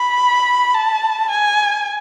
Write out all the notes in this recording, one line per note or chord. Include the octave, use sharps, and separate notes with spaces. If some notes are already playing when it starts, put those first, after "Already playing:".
Already playing: B5
A5
G#5